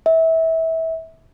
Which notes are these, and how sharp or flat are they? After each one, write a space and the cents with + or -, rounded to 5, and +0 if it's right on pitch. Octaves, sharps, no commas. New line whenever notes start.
E5 -25